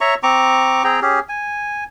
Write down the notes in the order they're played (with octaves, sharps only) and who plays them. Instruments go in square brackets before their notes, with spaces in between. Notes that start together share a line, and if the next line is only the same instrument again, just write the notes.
[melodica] C#5 E5 A#5 C#6
C4 A#5 C#6 D6
C4 G#4 G5 A#5
C#4 G4 G#4
G#5